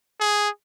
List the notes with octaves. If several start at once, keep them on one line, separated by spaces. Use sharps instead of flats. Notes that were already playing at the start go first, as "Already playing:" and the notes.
G#4